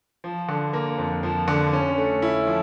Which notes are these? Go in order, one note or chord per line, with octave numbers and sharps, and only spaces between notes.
F3
D3
A#3
F2
F3
D3
C#4
A3
E4
F3